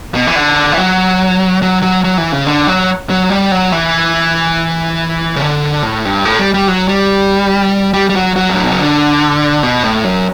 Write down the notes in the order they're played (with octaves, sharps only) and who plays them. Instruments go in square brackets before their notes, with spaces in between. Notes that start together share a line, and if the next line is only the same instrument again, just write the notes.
[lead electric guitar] B2
E3
D3
E3
F#3
F#3
F#3
F#3
E3
C#3
D3
F#3
F#3
G3
F#3
E3
C#3
D3
A2
G2
A2
G3
G3
F#3
G3
G3
G3
F#3
F#3
G2
A2
B2
C#3
D3
B2
A2
F#2